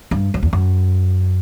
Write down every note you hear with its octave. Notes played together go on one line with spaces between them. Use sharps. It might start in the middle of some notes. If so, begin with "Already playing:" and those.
G2
F#2
E2
F#2